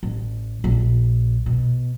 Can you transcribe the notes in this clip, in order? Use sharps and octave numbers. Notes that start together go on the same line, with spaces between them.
A1
A#1
B2